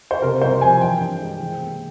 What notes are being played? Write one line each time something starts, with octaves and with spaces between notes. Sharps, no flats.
C5
C3 A#4
C2 C5
F3 G#5
E3 G5
G2
G#3
E3
A#3